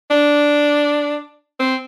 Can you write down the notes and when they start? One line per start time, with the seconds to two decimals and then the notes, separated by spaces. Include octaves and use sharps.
0.11 D4
1.60 C4